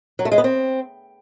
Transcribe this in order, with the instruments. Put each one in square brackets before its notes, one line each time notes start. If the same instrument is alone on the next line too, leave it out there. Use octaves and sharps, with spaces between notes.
[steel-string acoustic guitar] F#3
A3
G#3
B3
C4